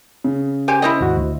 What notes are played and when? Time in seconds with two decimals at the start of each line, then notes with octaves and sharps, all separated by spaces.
0.24 C#3
0.68 G4 C5 G#5
0.82 E4 C5 D#5
1.01 D#2 G#2 F#4
1.17 D2